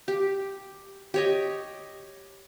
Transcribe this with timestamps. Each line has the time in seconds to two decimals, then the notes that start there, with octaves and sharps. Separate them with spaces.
0.08 G4
1.14 G4 C#5 D#5